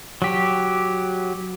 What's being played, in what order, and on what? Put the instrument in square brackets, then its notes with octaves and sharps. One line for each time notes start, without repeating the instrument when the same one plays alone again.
[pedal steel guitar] F#3 G4